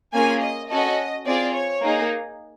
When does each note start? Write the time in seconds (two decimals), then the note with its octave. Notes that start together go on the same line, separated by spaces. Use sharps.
0.13 A#3 C#4 F4 G#4 G#5
0.42 D#5
0.70 C#4 F#4 A4 D#5
1.26 C4 F4 G#4 D5
1.54 C#5
1.82 A#3 D#4 G#4